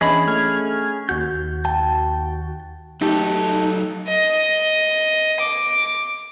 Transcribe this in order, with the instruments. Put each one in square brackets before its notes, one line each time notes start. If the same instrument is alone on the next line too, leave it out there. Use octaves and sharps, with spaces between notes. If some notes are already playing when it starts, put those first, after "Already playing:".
[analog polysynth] E3 B3 D4 [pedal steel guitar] C#4 G#4 [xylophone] D#5 B5
[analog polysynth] A3 F6 G#6
[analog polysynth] D#2 F#4 [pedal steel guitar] G6
[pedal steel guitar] G5 A5
[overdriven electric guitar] F#3 A4 [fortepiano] A3 G4 [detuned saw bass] D#4
[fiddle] D#5
D6